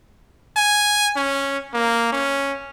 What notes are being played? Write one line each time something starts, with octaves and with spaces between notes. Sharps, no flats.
G#5
C#4
A#3
C#4